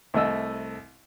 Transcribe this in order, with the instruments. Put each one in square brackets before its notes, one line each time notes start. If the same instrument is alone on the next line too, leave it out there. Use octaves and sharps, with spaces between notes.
[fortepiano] C2 A3 D#5 E6